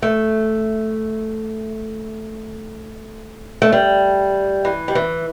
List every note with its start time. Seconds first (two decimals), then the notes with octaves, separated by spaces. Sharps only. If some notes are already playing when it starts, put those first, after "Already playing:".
0.02 A3
3.62 A3
3.72 G3
4.65 E3
4.88 G3
4.95 E3